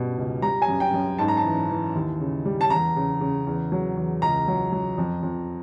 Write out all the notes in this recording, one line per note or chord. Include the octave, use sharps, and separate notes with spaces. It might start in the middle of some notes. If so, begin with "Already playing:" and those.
Already playing: G2 B2 G3
C#2
G3 A#5
G#5
F#2
G5
F#2
G#2 A5
A#5
A5
E3
E3
D#2
C#3
G3
A5
E2 A#5
C#3
C#3
E2
F#3
E2
C#2 A#5
F#3
F#3
F2
F2